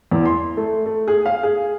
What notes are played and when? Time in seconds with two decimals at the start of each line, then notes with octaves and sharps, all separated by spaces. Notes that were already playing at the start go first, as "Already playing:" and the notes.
0.11 E2
0.25 C6
0.57 A3
0.86 A3
1.08 G#4
1.26 F5
1.43 G#4